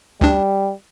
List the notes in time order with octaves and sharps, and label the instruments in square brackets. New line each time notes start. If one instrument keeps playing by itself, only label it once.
[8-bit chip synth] D2 D4 [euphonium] G3